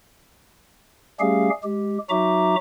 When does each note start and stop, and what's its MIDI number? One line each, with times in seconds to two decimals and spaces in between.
1.20 1.49 55
1.20 1.49 57
1.20 1.49 61
1.20 1.49 67
1.20 1.49 68
1.20 1.49 77
1.63 1.98 56
1.63 1.98 67
2.09 2.55 54
2.09 2.55 63
2.09 2.55 66
2.09 2.55 76
2.09 2.55 82
2.09 2.55 86